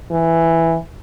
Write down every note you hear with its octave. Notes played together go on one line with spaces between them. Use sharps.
E3